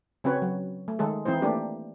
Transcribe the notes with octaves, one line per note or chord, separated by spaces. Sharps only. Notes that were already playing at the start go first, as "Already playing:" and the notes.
C#3 C4 C#4 F#4 B4 C#5
F#3
A3
D#3 G#3 G#4 A4
E3 C4 D#4 E4 C5
A3 A#3 D4 G4